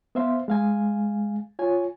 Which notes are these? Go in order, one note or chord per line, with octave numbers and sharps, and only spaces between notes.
B3 C5 E5 F5 C6
G#3 F5 G#5
F4 C#5 G#5